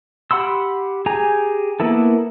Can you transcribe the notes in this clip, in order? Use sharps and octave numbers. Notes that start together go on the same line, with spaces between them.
G4 F#5 B5 C6 E6
G4 G#4 G#5 A#5
A#3 B3 E4 A4